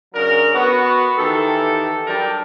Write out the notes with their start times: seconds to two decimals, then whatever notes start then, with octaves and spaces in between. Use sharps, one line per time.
0.15 C#3 F#3 C#4 D4 A#4
0.55 B3 F#4
1.18 D#3 E3 G4 A4
2.07 F#3 G3 D4 A#4 G5 A5